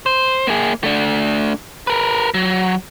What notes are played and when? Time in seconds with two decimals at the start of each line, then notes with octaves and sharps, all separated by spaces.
0.06 C5
0.47 A#3 G#4
0.84 A3 D4
1.87 A#4 B4
2.34 F#3